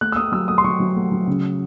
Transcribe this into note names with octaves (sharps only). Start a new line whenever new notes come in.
A3 F#6
E6
A3 D#6
F#3 E6
A3 D#6
C6
F#3 C#6
F#3
A3
F#3
C#3